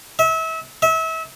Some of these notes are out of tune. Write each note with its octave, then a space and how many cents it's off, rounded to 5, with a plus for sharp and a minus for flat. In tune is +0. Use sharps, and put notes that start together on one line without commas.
E5 -30
E5 -30